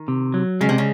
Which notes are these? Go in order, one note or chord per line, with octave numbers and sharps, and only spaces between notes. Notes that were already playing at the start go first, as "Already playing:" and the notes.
Already playing: D#3
C3
F#3
C#3 G#3
C3
C#3